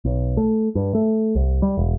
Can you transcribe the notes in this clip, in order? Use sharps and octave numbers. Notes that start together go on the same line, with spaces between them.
B1
A3
G2
A3
C2
G3
E1